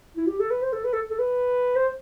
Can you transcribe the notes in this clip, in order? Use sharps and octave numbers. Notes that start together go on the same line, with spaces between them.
E4
G4
A4
B4
C5
A4
B4
A4
A4
B4
C5